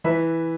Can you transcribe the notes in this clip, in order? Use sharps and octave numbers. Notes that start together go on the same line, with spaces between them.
E3 B4 E5